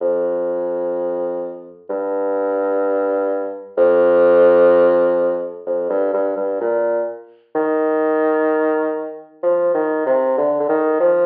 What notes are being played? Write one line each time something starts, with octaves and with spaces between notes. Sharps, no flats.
F2
G2
F2
F2
G2
G2
G2
A#2
D#3
F3
D#3
C3
D3
D3
D#3
F3